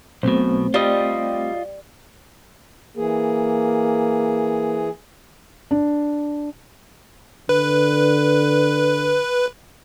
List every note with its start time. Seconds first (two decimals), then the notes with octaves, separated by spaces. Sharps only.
0.23 B1 B2 A3 C4 C5
0.74 G3 F4 D#5
2.97 E3 A#3 G#4
5.71 D4
7.49 D3 B4